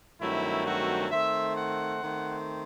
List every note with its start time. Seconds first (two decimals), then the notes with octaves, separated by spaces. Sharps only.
0.20 G2 D#3 F#3 A3 C4 E4
0.65 F#4
1.11 D#3 A3 C4 E5
1.56 F#5
2.01 D#3 A3 C4